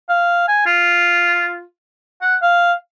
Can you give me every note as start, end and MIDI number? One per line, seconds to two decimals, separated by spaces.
0.09 0.45 77
0.48 0.61 80
0.66 1.63 65
2.22 2.35 78
2.42 2.73 77